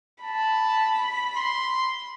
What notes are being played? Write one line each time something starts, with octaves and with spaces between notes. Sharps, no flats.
A5 B5
C6